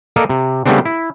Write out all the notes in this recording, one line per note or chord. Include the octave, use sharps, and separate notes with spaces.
A#3 A4 A#4 D5 D#5
C3
C#3 G3 A3 B3 C4 D4
E4